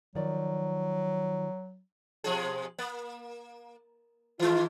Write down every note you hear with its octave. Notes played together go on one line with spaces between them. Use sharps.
D#3 F3 F#3 D5
B2 F3 G#4
A#3
D#3 G#3 F4